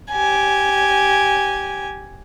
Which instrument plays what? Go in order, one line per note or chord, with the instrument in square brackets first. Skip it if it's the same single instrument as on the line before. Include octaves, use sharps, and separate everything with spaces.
[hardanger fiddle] G4 G#5